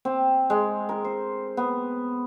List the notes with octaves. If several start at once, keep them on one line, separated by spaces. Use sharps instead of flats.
C4
G#3
A#4
C5
B3